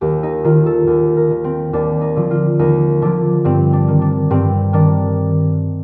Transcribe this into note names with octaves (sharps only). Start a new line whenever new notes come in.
D#2 G4
D#4
D#3 F4
A4
D#2
A#4
D#3
C4
D#2 D4
D#4
D3 F3
F4
D#2 D#4
D3 F3 D4
G2 C4
D4
D#3
D4
G2 C4
D#3 D4